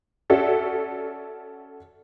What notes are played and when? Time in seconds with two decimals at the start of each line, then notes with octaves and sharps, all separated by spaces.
0.30 C#4 F#4 A4 D5 E5